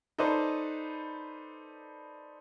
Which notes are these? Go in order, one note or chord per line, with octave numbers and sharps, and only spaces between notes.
D#4 A4 B4 C5 D5